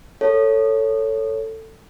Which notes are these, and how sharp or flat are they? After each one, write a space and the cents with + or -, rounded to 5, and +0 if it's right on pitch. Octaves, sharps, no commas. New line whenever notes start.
A4 +15 C#5 +0